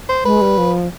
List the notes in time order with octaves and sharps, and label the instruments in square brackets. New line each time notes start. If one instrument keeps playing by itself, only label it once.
[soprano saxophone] C5
[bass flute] G#3 [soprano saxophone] B4
[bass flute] G3
F3